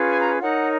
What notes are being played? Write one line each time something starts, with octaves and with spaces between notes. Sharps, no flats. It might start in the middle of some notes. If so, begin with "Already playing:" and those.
Already playing: C#4 F4 G#4 B4
G#5
A#5
D#4 A#4 C#5 F#5